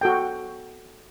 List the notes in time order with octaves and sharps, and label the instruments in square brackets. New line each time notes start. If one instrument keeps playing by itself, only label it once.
[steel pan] F#4 A4 G5